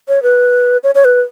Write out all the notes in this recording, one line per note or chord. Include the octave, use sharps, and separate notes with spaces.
C#5
B4
C#5
C#5
B4